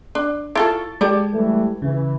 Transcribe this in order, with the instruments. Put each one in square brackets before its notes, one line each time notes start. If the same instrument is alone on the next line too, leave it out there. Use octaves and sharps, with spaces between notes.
[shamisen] D4
[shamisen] E4 F4 A4 [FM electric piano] C#6 A6
[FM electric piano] G#3 [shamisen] G4 A4 D5
[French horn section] E3 G3 A3
[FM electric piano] C#3 [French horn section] E3